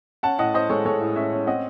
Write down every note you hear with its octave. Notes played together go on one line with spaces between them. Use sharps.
C#4 F#5 A5
A2 D#5 F#5
C#4 C5 D#5
G#3 A4 C#5
G#3 A4 C#5
A2
C#4 C#5 E5
C#4
C4 D#5 F#5